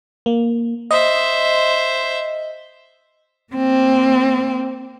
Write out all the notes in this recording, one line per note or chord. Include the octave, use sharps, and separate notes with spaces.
A#3
C5 D#5 E5
A#3 C4